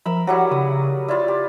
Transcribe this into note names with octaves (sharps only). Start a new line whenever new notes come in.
F3 A#4 E5 B5
F#3 G3 E4 F#5
C#3 D#6
E4 F4 D5
G4